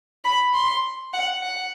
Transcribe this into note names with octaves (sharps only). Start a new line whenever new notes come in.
B5
C6
F#5
F#5